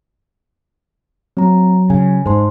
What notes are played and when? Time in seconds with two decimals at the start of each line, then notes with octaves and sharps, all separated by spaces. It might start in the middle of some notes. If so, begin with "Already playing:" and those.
1.37 F#3 C4 A#5
1.90 C#3 G#5
2.26 G#2 C5 A5 C6